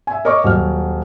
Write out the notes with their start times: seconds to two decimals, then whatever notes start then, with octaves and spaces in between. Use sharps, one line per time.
0.07 E5 G#5
0.25 A#4 C#5 D#5 C#6 D6
0.44 D#1 F#3 F6